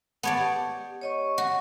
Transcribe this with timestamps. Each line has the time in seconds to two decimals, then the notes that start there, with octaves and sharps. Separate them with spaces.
0.23 B3 C#5 D5 A5
0.38 G4
1.01 C#5 D#5 C#6
1.38 F#4